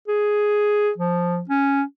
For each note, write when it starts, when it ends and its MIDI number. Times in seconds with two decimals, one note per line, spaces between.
0.08 0.91 68
0.98 1.41 53
1.49 1.82 61